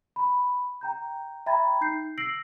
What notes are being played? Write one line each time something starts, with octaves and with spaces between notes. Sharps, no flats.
B5
G5 A#5 G6
E5 G5 A#5 B5 G#6 A6
D#4 G6 C7
E6 A#6 C7 D7 F#7